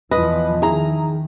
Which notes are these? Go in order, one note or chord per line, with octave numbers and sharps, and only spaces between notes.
E2 E3 F3 B4 D#5
D#3 E4 G#4 A#5